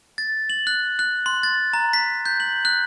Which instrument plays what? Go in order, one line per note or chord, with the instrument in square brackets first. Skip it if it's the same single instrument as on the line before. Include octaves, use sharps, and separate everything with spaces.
[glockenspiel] A6
F#7
F#6
F#6
C6
A6
A#5
B6
G6
F#7
F#6